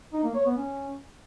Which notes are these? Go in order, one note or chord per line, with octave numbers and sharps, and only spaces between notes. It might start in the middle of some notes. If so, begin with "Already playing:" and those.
D#4
A#3
C#5
B3
C#4